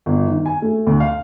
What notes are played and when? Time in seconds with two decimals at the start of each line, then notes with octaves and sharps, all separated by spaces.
0.06 G1
0.27 D#3
0.46 G#5
0.62 A3
0.87 D2
1.00 F5